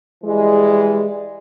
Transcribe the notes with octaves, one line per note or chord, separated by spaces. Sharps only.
E3 G3 G#3